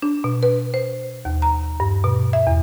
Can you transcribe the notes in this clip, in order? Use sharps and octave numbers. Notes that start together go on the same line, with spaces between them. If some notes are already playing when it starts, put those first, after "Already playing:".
D4
B2
B4
C5
D#2
A#5
G2
B2
E5
E2